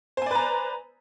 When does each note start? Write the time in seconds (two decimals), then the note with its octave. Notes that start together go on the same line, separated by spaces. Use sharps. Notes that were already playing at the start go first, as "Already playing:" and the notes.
0.17 C5
0.22 G#5
0.26 D5
0.31 B4
0.35 A#5